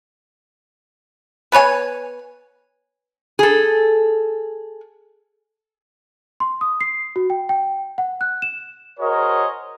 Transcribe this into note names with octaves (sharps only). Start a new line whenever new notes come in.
B3 B4 C#5 G#5
G#4 A4
C6
D#6
C7
F#4
G5
G5
F#5
F#6
E7
F#4 G#4 A#4 C5 C#5 D#5